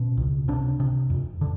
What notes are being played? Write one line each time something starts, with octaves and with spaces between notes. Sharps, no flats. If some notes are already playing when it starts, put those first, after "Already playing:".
Already playing: B2 C#4
C#2
C3 D4
C3
F2
D3